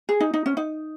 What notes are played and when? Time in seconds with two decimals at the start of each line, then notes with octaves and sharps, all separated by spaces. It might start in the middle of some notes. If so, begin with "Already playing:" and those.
0.09 G#4
0.20 D#4
0.34 D#4
0.46 C#4
0.57 D#4